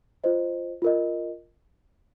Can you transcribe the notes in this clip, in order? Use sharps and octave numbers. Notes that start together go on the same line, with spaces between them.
F4 C5 D#5
F4 A#4 D#5